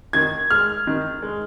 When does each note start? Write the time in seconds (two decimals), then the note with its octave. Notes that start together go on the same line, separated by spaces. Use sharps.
0.13 D#3 G#6
0.50 G#3 F6
0.87 D#3
1.22 G#3